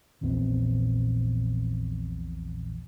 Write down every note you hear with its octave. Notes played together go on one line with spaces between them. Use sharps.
A#1 E2 A#2 C4